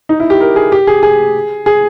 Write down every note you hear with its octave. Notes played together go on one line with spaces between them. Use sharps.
D#4
E4
G4
A#4
G#4
G4
G#4
G#4
G#4